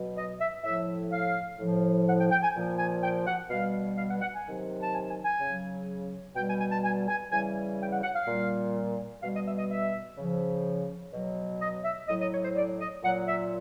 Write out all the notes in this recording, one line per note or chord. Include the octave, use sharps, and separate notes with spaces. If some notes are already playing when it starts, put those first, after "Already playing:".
Already playing: B2 F#3
D#5
E5
A2 F3 E5
F5
A2 F3
F#5
G5
G5
G#5
A#2 F3
G#5
G5
F#5
B2 G3 F5
F5
F#5
F#5
G#5
C3 D#3 F#3
A5
G#5
G#5
G#5
C#3 F#3
B2 G3 G5
G#5
G#5
A5
G#5
G#5
C#3 E3 G3 G#5
G5
F#5
F#5
F5
A#2 G3
B2 G3 F5
D#5
E5
D#5
E5
C#3 F3
B2 F#3
D#5
E5
A2 F#3 D#5
D#5
C#5
C5
D5
D#5
A#2 F#3 F#5
E5